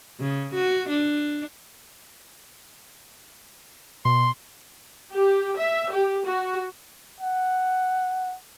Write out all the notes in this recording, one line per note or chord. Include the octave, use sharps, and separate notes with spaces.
C#3
F#4
D4
B2 C6
G4
E5
G4
F#4
F#5